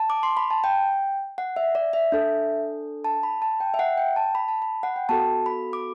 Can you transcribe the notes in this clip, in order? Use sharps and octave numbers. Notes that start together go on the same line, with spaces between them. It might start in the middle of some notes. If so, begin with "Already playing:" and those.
Already playing: A5
D6
C6
B5
A5
G5
F#5
E5
D5
E5
D4 A4
A5
B5
A5
G5
E5
F#5
G5
A5
B5
A5
B5
F#5
G5
B3 F#4 A4 A5
B5
D6